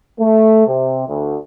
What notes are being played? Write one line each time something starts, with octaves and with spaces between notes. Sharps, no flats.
A3
C3
D2